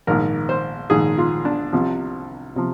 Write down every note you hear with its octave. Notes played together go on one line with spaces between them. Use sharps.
A#1 G#2 D#3 A#4
C5
A#1 G#2 D#3 G#4
F4
D4
C2 C3 F3
C3 F3